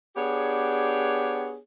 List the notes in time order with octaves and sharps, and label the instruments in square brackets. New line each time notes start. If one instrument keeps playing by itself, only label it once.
[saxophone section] B3 D4 G4 G#4 C#5